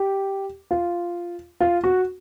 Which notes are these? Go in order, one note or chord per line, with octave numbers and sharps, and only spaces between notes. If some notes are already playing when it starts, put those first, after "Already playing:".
Already playing: G4
F4
F4
F#4